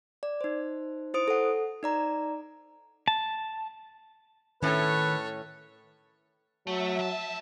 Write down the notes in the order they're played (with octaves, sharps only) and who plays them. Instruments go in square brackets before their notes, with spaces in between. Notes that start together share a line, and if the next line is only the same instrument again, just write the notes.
[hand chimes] D5
D#4 C5
E4 C5 D#6 D7
A4 F#5
D#4 D5 A#5
[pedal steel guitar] A5
[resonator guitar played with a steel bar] A2 C#4 [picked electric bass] D#3 [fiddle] A4 C#5 [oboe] B4
[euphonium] F#3 [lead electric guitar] A3 [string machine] E5
[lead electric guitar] F3 A5